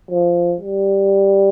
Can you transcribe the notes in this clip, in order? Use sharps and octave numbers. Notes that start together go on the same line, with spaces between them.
F3
G3